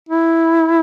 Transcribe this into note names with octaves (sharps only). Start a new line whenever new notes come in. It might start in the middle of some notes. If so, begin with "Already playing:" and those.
E4